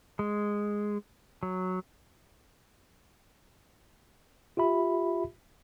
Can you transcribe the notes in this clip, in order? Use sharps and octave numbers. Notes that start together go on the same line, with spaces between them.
G#3
F#3
F4 G4 E5 B5